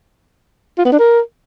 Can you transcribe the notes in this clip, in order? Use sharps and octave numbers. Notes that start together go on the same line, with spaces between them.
F4
B3
D4
A#4